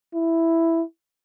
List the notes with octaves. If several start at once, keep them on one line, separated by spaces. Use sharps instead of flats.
E4